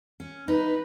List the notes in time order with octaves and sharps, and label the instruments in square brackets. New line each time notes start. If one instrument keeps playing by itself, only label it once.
[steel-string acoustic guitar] C#4
[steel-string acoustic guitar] D#4 [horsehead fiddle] B4